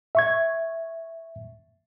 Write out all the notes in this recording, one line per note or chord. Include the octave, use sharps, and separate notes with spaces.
E5 C#6 G#6